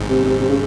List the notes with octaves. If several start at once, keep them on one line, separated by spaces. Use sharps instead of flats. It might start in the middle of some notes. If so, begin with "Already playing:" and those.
Already playing: G#1 G#2
C3
C3
C3
C#3